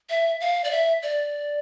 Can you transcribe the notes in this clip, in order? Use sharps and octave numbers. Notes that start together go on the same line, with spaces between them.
E5
F5
D5
E5
D5